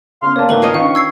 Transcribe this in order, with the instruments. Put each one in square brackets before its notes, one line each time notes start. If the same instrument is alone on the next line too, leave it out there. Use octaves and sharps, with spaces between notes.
[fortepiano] C#3 B3 [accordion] F5 C6 F6
[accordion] A#3 [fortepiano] B4 A5 [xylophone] C#5 D5
[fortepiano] G#1 D#3 A5 [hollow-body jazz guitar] A3 [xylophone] A#4 B4 F#7
[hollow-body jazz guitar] F4 C#5 D#5
[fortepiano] D#3 C#4 D4 [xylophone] F5 [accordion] C#6
[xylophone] E6 G#6 C7